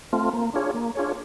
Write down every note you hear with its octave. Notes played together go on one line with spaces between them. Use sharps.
A3 C4 F4
A#3
D4 F4 G#4 C#5
A#3
D4 F4 G#4 C#5